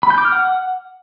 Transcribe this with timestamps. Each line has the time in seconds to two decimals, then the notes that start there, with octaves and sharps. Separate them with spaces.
0.03 B5
0.10 G6
0.18 D6
0.25 F6
0.32 F#5